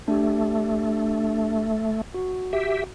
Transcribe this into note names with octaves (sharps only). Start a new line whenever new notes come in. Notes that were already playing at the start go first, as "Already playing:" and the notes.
A3 D4 G4
F#4
G4 E5